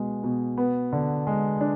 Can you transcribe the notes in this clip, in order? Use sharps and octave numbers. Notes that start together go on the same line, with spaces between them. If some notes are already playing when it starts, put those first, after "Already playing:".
Already playing: B2 G#3
B2
B3
D3
G#3
D4